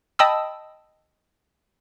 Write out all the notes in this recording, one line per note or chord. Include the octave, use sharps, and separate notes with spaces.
D#5 G5 A5 B5 D#6 E6